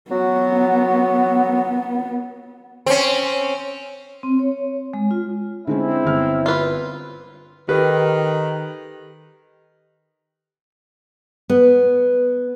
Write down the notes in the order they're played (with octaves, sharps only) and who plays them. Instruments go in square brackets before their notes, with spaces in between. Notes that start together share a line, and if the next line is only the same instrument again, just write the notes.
[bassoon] F#3 [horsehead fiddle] B3
[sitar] C4 C#4
[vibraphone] C4
C#5
G#3
F4
[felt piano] D3 G#3 C#4 [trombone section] C4 E4
[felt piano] G1 F6
[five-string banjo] F4 B4
[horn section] D#3 [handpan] G4 A4 [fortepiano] B4
[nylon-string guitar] B3